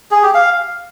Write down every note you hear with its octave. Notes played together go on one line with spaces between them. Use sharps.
G#4
G4
F5